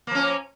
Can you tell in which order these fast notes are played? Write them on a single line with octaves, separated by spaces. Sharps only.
A#3 F3 C#4